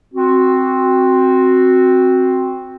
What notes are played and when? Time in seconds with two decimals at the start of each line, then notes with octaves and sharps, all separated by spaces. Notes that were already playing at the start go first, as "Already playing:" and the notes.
0.14 C4 F#4